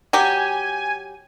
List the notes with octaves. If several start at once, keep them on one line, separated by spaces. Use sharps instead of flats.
F#3 G4 G#5